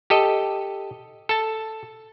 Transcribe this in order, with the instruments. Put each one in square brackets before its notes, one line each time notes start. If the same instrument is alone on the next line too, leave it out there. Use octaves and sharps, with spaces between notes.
[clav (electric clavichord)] G4 A4 D#5
A4 A5